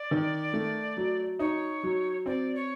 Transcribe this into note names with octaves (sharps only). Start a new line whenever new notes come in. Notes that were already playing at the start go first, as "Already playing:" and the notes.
Already playing: D5
D#3
A3
F#3
D#4 C#5
F#3
C4 D5
C#5